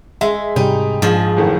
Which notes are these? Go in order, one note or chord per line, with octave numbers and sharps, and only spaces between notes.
G#3 E5
G#2 C3 G3 D#4
A#1 G#2 F3 G#4
F#1 A2 D#3